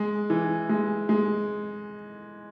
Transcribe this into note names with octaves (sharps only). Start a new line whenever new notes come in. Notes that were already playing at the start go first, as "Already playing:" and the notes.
Already playing: G#3
E3
G#3
G#3